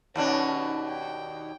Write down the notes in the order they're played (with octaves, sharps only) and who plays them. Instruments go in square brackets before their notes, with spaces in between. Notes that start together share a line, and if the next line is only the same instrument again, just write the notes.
[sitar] D#2 B2 D4 [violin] C#4
[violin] G5